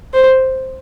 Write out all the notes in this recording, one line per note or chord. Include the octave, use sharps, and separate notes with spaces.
C5